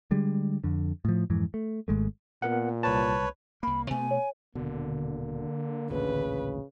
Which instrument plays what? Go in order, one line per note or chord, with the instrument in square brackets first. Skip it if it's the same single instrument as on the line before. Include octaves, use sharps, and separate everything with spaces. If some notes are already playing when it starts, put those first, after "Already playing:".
[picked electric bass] D3 G3 G#3
F2 D3
A2 F3
F2 G#2 E3
A3
G#1 G#3 A3
[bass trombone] A#2 [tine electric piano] B3 A#4 F#5
[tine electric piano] C2 A5 [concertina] B4 C#5
[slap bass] C2 A#3 [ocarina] B5
[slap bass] B2 A3 B3 [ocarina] G#5
[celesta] C#5
[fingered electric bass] D#1 B2 [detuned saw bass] D3 [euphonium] A#3
[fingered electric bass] A1 D2 A#2 [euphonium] C#3 [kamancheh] B4